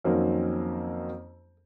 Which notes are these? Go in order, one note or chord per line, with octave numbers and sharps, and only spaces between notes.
F2 D#3 F#3 A#3 C4 C#4